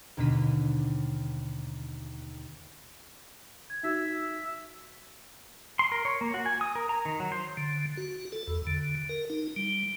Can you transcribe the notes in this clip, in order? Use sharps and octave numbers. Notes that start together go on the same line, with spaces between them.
D#2 B2 D3 D4 B6 D#7
G#6
D#4 F#4 E5 G#6
C6
A#4
C#5
A#3
F#4
G#5
D#6
A#4
A#5
D#3
F#3
C5
D3
F#4
A4
E2
D3
A#4
D#4
G3